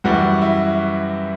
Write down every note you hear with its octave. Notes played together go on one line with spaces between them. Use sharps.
F#2 E3 G3 F#4
E4